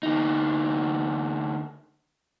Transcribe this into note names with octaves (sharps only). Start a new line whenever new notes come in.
D2 D#4